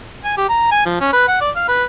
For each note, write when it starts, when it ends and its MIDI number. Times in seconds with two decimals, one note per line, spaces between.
0.24 0.36 80
0.37 0.47 67
0.49 0.68 82
0.71 0.82 80
0.86 0.96 53
1.01 1.08 61
1.13 1.28 71
1.28 1.39 78
1.41 1.50 74
1.56 1.63 77
1.68 1.84 71